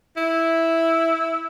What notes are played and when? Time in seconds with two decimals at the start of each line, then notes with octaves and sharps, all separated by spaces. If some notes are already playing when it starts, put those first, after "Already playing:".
0.17 E4